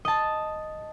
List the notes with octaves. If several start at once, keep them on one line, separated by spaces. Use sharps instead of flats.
D#5 A5